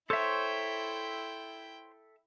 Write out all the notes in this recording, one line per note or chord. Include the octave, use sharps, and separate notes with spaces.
E4 A4 C5 C#5 E5 G5